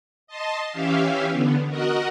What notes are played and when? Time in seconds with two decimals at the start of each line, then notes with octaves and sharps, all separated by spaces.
0.27 D#5 A5 C6
0.72 E3 C#4 G4 E5 F5
1.31 D3 B3
1.68 F#4 A#4 D#5 F#5